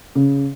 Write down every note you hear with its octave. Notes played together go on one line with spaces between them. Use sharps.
C#3